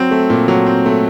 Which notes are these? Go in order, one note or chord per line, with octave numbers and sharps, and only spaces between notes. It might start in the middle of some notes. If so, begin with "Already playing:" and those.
Already playing: F#3 C4
A3
A#2
F#3
C4
A3